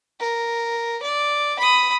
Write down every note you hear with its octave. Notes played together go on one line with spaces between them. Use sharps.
A#4
D5
B5 D#6